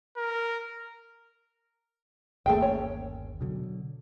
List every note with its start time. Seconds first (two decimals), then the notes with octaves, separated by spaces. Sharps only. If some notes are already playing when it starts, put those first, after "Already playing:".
0.17 A#4
2.46 G1 D#2 A3 A#3 G#4 G5
2.61 C#4 C#5
3.41 B2 D3 F#3